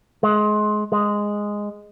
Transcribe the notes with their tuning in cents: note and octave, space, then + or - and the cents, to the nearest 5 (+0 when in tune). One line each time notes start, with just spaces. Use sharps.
G#3 +25
G#3 -5